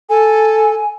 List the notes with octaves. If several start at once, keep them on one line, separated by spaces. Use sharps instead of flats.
A4 G#5